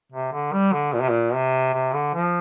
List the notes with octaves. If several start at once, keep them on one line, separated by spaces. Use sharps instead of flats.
C3
D3
G3
D3
A#2
C3
A#2
C3
C3
D3
F3